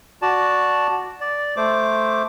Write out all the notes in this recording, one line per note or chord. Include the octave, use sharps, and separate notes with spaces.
F#4 D5 A5
D5
A3 C5 D6